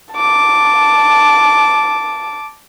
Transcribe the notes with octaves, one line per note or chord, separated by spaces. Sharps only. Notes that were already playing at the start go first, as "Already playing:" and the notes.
A5 D6